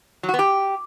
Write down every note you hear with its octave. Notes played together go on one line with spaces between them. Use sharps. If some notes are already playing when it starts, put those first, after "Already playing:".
F#3
F#4
B3
G4